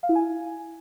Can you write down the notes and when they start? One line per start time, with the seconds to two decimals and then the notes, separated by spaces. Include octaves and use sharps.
0.03 F5
0.09 E4
0.15 G#5